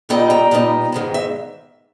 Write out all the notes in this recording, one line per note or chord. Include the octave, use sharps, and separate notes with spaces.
A#2 G3 B3 D#4 D#5 G5
G5 A#5
A#2 G3 B3 D#4
G#2 D#3 G#3 B3
E5